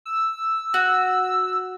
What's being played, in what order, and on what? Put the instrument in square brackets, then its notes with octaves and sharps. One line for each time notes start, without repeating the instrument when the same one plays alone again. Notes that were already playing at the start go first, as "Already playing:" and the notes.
[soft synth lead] E6
[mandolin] F#4